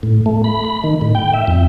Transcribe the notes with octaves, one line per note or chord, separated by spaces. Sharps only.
A2
A3
B5
B5
D#3
A2
G5
E5
F2